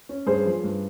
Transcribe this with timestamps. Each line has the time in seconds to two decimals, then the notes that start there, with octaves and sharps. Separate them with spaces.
0.09 C#4
0.27 G2 G#4 C5
0.46 F3
0.64 G2